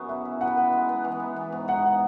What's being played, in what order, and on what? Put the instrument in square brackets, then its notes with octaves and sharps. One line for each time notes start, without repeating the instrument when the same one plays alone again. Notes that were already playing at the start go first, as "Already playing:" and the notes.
Already playing: [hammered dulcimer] F#2 B3 G#4
[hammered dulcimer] E4 [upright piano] E5
[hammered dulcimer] E4
[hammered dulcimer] B4 [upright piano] F#5
[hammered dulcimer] B4
G#3
B3
E3
B3
B3
G#2
[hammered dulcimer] G#2 [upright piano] F#5